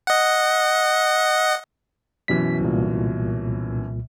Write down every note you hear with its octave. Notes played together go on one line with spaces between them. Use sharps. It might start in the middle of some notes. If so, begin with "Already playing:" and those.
D#5 F#5
F#2 B2 E3 B6
C2 A#2